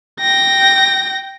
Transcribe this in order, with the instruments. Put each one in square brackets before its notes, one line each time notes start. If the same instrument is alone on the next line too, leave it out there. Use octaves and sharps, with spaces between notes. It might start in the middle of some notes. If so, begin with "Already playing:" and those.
[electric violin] G5 A#6